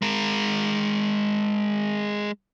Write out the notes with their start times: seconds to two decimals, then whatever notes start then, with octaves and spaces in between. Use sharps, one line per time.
0.02 G#3 A#4